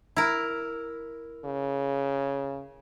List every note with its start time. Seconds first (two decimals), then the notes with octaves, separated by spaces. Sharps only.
0.16 E4 A#4
1.45 C#3